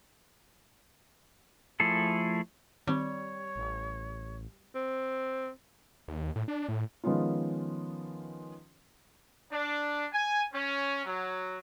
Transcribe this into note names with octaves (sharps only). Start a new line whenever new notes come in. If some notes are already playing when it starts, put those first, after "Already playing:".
F3 A3 E4 G#4 A4
D#3 G3 C4 C#5
A1
C4
D#2
A2
D4
A2
D#3 F3 G#3 B3 C#4 F4
D4
G#5
C#4
F#3